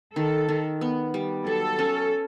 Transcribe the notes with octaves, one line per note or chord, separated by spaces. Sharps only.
D#3 A4
D#3
B3
G3
F#3 A4
C#4